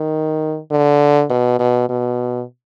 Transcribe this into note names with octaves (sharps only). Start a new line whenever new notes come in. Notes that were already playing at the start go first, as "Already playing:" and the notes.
Already playing: D#3
D3
B2
B2
B2